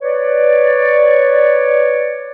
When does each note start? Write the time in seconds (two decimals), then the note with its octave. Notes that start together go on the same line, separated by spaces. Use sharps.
0.01 B4 C#5 D5